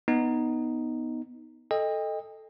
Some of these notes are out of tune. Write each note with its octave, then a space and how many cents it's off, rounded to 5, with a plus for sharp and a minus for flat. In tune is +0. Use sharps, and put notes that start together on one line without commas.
B3 +0 D#4 +0
A4 +0 D#5 +0 G5 +35